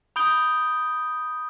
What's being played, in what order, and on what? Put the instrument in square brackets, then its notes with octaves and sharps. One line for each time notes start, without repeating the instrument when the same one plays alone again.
[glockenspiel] B5 D#6 G6 D7 G7